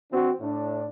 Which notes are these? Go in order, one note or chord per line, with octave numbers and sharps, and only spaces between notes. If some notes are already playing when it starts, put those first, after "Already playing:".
E3 C4 D4 F#4
A2 D4